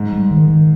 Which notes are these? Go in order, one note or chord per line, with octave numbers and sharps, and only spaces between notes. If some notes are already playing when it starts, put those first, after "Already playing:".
Already playing: G#2
G3
D#3
D#3